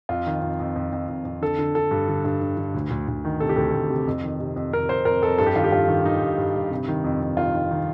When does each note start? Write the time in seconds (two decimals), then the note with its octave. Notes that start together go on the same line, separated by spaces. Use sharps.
0.09 F2 F4
0.26 D#3
0.42 F2
0.60 F2
0.76 F2
0.93 F2
1.08 F2
1.25 F2
1.42 D3 A4
1.58 D3
1.75 D3 A4
1.91 G2
2.08 D3
2.25 G2
2.41 D3
2.57 D3
2.74 D2
2.90 D2
3.08 D2
3.25 D#3
3.40 C3 A4
3.49 G4
3.56 D2 A4
3.74 D2
3.90 C3
4.07 F2
4.24 D#3
4.40 C3
4.56 F2
4.73 F2 A#4
4.89 F2 C5
5.05 F2 A#4
5.22 F2 A4
5.38 G2 A4
5.46 G4
5.55 D#3 F4
5.64 G4
5.72 G2 F4
5.88 D#3
6.05 D#3 D#4
6.22 G2
6.38 G2
6.55 G2
6.71 C3
6.88 D#3
7.04 F2
7.21 F2
7.37 D#3 F4
7.54 D#3
7.71 D#3